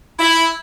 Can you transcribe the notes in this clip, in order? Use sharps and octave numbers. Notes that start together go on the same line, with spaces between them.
E4